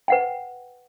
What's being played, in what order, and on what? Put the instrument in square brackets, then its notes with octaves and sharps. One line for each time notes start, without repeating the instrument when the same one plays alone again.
[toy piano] B4 F#5 G5